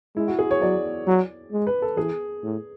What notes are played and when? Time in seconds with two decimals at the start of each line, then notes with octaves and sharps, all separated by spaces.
0.16 G#3 E4
0.28 F#4
0.39 G#4
0.51 C#5
0.61 F#3 D5
1.07 F#3
1.52 G#3
1.67 B4
1.82 A4
1.97 E3 G#4
2.43 A2